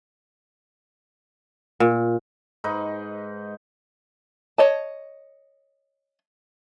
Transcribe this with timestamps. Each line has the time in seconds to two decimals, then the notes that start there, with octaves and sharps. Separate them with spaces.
1.80 A#2
2.64 G#2 D#4 B4
4.58 C#5 D#5 A5